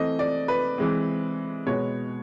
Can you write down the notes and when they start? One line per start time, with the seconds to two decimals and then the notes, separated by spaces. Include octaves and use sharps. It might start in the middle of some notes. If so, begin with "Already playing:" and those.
Already playing: E3 A3 C4 D#5
0.19 D5
0.48 B4
0.78 E3 G#3 C4
1.66 B2 G#3 B3 C#5